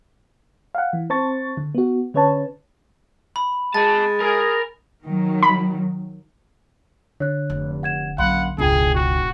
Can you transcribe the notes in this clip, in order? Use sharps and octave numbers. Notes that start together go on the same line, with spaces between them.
F5 F#5
E3
C4 C5 A5 C#6 A6
D3
B3 F#4
D3 C#4 B4 C#5 A5
B5
G#3 D#5 A5 A6
G#4 A#4
D#3 F#3
B5
D3 C#5 F#6
F1
F#5 G#6 E7
A#1 F#2 F5 F#5 B5 C6
E1 C#2 G#2 D4 F4 G#4 G5
F#4